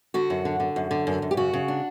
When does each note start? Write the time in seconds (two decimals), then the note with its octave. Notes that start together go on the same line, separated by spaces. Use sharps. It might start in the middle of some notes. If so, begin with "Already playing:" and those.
0.14 D3 F#4
0.30 F#2
0.45 D3
0.60 D3
0.76 F#2
0.91 D3
1.07 F#2
1.22 F#2
1.31 G4
1.37 C#3 F#4
1.53 C#3
1.68 D4